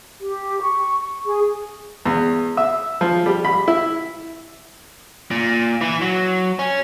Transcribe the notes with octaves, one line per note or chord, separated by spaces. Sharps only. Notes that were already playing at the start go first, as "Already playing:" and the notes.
G4
C#6
G#4
E2
E5
F3
G3
B5
E4
A#2
E3
F#3
C#4